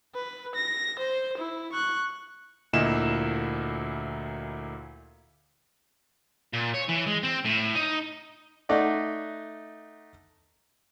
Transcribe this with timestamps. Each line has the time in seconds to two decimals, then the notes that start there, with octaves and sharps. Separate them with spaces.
0.15 B4
0.55 A#6
0.99 C5
1.38 E4
1.72 C#6 F#6
2.73 D2 A#2 A#3 E4 D#5 E7
6.53 A#2
6.74 C#5
6.88 E3
7.06 G#3
7.23 C4
7.45 A2
7.75 D#4
8.69 A3 D#4 D5 D#5 F#5